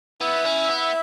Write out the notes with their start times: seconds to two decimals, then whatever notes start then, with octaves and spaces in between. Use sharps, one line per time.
0.21 B3 E4 E5
0.45 C#4
0.68 B3